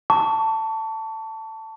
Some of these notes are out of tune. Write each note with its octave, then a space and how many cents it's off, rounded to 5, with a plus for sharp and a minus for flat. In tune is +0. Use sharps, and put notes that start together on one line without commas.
A5 +10 C#6 +35